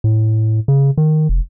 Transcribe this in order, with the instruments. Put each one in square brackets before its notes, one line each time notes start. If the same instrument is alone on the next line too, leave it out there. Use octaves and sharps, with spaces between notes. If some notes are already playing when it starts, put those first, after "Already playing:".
[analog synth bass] A2
C#3
D#3
F1